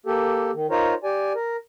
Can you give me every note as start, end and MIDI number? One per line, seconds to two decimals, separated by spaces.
0.06 0.51 58
0.06 0.51 67
0.06 0.51 69
0.53 0.67 51
0.70 0.94 63
0.70 0.94 65
0.70 0.94 70
0.70 0.94 72
0.70 0.94 73
1.04 1.33 67
1.04 1.33 74
1.04 1.33 80
1.35 1.56 70